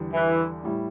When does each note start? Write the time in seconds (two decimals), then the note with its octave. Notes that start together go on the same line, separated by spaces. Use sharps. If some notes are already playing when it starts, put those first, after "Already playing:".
Already playing: E2 D3 G3 D4
0.14 E3
0.64 A2 G3 E4